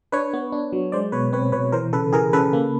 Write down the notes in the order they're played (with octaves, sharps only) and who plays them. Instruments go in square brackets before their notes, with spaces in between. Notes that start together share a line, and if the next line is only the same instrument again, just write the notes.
[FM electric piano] D4 B4 C#5
B3
D4
F#3
G#3 C5 D5
B2 B4 C#5
C4 B4 C#5
B2 B4 C#5
E3 A#4 C5
C#3 A4 B4
E3 G#4 A#4
C#3 A4 B4
A#3